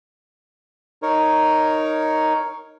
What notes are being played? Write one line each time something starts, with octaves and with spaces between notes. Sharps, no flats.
D#4 A#4 C#5